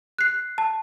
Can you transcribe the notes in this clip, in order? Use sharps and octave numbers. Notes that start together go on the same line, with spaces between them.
F#6 C7
A5